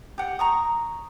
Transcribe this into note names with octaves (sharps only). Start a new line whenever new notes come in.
G4 F#5
A#5 C#6 D#6